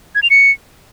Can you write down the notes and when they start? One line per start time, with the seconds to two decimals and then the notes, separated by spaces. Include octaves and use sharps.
0.15 G#6
0.23 F7
0.30 C#7